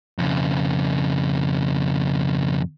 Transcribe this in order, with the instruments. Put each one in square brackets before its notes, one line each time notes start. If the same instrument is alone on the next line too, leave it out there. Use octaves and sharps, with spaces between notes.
[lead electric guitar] F2 C#3